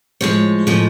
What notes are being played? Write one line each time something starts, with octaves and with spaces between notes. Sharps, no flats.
A2 F3 G#3 C#5
A2 F3 G#3